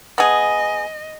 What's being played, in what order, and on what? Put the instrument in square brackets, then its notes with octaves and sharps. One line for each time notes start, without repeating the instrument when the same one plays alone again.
[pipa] B3 G#4 [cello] D#5